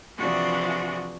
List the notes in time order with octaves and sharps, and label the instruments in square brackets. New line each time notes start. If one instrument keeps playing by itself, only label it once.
[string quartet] C3 E3 F3 D4 F#4 G#4